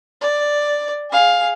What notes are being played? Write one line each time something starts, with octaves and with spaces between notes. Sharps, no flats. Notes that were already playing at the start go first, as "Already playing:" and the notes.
D5
G#4 F5